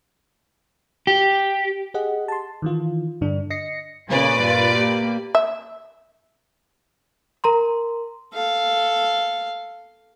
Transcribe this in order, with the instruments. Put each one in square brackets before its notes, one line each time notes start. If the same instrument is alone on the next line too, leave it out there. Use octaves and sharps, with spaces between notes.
[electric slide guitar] G4
[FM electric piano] G4 G#4 D#5 F#5
A5 C6
D#3 E3 F4
G2 D3 D4
D#5 A#6 C7 C#7
[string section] A#2 B4 D5 [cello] C#3 C#4
[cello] G2 F4
A#3 G4
[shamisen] E5
[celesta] A#4 A#5 C6
[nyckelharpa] A4 F5